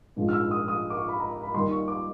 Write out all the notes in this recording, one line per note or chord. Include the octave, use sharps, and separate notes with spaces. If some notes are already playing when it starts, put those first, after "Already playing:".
A#1 G#2 F3 G#3
F6
E6
D#6
D#6
D6
C#6
B5
A#5
B5
D#2 D#3 G3 C6
C#6
D6